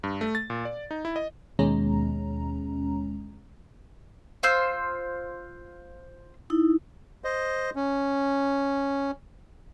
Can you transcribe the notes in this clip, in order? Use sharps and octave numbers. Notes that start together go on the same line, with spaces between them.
G2
A3
A6
A#2
D5
D#4
E4
D#5
D#2 B2 G#3 C#4 A#5
F4 C5 E6
D#4 E4
C5 D#5
C#4